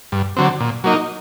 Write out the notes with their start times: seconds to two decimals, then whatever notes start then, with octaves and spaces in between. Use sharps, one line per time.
0.12 G2
0.37 D3 F#3 C4
0.60 A#2
0.84 F#3 A#3 D#4